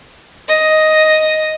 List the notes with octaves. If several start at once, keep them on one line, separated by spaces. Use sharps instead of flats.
D#5